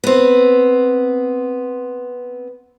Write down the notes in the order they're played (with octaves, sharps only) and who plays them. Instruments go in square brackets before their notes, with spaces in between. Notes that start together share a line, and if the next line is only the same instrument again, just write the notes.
[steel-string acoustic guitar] B3 C4